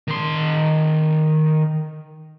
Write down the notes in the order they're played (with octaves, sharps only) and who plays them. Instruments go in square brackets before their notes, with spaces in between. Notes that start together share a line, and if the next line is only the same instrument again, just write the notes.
[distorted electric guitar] D#3 C6